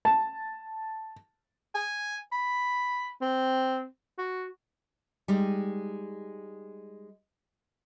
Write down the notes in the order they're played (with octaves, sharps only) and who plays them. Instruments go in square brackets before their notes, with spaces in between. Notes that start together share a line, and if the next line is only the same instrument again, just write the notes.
[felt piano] A5
[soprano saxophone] G#5
B5
C4
F#4
[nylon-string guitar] G3 G#3 D#4